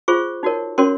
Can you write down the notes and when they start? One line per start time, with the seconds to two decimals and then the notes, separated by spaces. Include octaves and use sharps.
0.08 F4 G#4 C5 C#6
0.43 D#4 F#4 A#4 C#5
0.78 C#4 F#4 A#4 C#5 C6